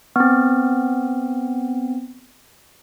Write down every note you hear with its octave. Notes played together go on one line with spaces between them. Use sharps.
B3 C4